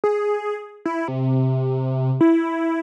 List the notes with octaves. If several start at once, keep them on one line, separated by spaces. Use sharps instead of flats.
G#4
E4
C3
E4